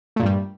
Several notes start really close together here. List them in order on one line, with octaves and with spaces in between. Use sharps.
A3 A#2 G2 G3